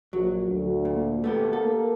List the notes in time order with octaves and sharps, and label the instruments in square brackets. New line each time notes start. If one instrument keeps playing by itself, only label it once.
[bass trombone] A#1 [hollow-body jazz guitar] F#3
[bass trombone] D2
[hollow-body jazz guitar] A#2
A3 B3 G4
[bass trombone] A#3 [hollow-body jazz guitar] A4